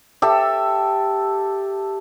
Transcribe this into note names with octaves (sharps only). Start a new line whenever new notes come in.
G4 A4 E5